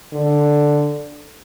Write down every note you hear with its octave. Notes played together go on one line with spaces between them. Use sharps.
D3